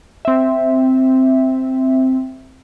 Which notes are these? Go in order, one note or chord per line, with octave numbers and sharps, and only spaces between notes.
C4 E5